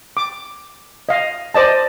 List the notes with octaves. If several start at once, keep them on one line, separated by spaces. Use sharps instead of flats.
D6
D#5 F5
C5 D5 D#5 A5